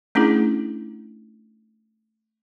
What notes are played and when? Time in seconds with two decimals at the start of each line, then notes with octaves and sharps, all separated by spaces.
0.15 A3 C#4 D4 E4 G#4